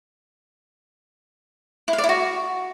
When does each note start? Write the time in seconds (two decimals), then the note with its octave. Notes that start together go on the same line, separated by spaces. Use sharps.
1.88 E4
1.93 F5
1.98 D5
2.04 E4
2.09 F#4